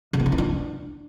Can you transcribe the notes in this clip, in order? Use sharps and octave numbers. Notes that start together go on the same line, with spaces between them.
C#3
B3
D#4
E3
D4